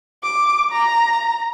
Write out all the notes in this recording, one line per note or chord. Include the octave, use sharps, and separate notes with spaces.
D6
A#5